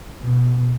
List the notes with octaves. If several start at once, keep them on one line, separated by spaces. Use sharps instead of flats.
B2